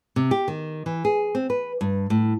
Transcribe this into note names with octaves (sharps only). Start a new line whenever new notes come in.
C3
G4
D#3
E3
G#4
C4
B4
G2
A2